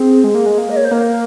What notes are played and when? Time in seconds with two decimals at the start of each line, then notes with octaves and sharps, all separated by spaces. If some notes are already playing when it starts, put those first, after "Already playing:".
Already playing: C4 G#4
0.24 G#3
0.35 A#3
0.46 G#3
0.58 A#3
0.69 D#5
0.76 C#5
0.84 C5
0.91 A#3 A#4